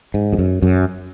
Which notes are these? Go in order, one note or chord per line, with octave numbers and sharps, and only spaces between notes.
G#2
F2
F#2
F#2